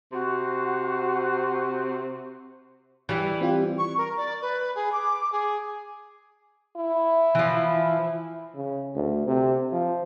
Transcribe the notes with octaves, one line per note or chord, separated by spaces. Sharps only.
C3 F#4
E3 G3
C4 F4 G4
C#6
A#4
D5
B4
G#4
D6
G#4
E4
E3 F3
C#3
D2
C3
F3